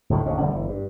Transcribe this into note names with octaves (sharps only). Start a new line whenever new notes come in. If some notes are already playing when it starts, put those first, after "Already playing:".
D2 A2 D3 D#3
G#1 D#2 D3 C#4
E1 D3 G3 A3
G1 E3
G2